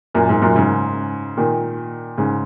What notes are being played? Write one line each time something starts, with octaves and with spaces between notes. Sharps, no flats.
F#2 A#2
G#2
F#2 A#2
G#2 C#3
A#2 D#3
G#2 C#3